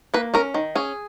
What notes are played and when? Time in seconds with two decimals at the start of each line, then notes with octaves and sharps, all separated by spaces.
0.14 A#3 B4
0.34 C#4 A#4
0.54 D#3
0.75 C#4 G#4